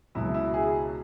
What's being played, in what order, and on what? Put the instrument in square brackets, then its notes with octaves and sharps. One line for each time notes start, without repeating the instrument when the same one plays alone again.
[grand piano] C#2 B2 F#3 E4
E4
G#4